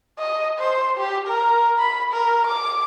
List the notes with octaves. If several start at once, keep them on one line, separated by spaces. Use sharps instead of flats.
D#5
C5
G4
A#4
B5
A#4
D6